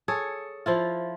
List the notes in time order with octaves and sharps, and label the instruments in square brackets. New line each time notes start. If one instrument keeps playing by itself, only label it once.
[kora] G#4 A4 C#5
F3 E4 F4